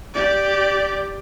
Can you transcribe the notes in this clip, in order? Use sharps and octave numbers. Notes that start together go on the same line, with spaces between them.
G4 D5